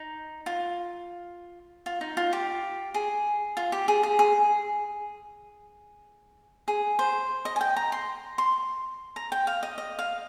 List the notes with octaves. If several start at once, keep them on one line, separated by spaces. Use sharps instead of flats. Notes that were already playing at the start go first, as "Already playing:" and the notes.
Already playing: D#4
F4
F4
D#4
F4
G4
G#4
F4
G4
G#4
G#4
G#4
G#4
C5
D#5
G#5
G5
A#5
C6
C6
A#5
G5
F5
D#5
D#5
F5